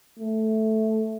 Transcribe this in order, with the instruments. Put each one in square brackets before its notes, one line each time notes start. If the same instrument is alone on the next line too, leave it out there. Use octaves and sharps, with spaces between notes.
[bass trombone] A3